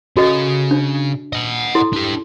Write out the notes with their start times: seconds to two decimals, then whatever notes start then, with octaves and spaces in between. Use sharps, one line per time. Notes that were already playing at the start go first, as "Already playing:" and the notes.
0.17 C#3 F#4 A4 D#5
0.71 D4
1.33 D#5 F#5
1.75 E4 A4 C6
1.93 D4 G4